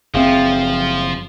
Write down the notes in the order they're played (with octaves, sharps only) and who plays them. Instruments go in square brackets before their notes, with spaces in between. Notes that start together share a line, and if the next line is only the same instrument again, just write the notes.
[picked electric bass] F#1 C4 [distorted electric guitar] F3 [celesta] G#4 E5 F5